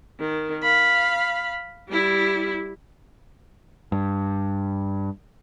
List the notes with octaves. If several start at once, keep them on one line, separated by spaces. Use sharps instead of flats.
D#3
F5 B5
G3 E4
G2